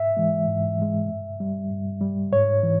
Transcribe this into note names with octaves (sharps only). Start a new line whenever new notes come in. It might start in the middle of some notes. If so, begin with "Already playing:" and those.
Already playing: G#2 E5
E3 G#3
G#2
E3 G#3
G2
G3
G2
G3
G#2 C#5
E3